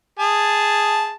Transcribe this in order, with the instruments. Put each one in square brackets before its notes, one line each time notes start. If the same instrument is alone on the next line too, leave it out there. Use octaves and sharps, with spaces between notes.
[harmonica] G#4 A5